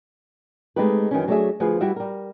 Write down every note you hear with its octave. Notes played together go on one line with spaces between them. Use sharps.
G#3 A3 C4 D#4 G4 B4
F#2 D#3 E3 C#4
F#3 A3 D4 G4 G#4 E5
D2 F3 G#4 B4
G3 E4 F#4 G4 E5
G3 A#4